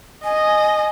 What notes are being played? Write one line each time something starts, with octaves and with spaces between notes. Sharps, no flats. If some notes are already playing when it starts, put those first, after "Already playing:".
D#5 G#5